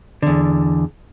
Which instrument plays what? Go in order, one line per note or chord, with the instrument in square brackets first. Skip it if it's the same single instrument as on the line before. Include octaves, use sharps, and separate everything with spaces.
[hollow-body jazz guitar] E2 D3